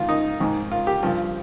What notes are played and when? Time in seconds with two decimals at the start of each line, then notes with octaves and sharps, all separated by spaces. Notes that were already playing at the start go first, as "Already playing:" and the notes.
Already playing: G#2 D#3 F4
0.08 D#4
0.40 G#2 D#3
0.71 F4
0.87 G4
1.03 G2 F3